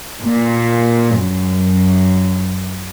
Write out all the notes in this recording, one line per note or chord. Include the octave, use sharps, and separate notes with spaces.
A#2
F#2